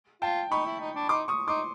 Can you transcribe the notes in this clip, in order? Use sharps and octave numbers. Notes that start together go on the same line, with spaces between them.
F4 G5 A5
D#4 B5 C#6
E4
D#4
D4
D#4 C6 D6
C#6 D#6
D#4 C6 D6